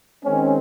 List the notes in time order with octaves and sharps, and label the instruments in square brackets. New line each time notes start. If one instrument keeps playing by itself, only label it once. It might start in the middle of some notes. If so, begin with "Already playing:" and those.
[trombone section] D#3 G#3 C4 C#4